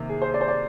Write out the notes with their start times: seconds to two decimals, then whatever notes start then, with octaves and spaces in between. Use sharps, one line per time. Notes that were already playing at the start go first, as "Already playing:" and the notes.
Already playing: C3 D#3 A#3
0.09 G#4
0.22 C5
0.34 D5
0.41 C5
0.48 D5